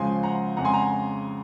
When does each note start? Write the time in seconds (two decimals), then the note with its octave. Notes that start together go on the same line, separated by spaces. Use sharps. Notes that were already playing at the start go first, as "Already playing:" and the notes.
Already playing: C#2 C#3 F3 G#3 G#5 C6
0.23 F#5 A#5
0.56 F2 C#3 G#3 F#5 A#5
0.65 G#5 C6
0.73 F#5 A#5